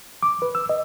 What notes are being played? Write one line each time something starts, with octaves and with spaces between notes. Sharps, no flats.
D6
B4
E6
D#5